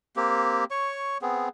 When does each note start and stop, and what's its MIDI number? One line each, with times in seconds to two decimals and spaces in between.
0.16 0.64 58
0.16 0.64 60
0.16 0.64 67
0.71 1.18 73
0.71 1.18 85
1.22 1.49 59
1.22 1.49 60
1.22 1.49 68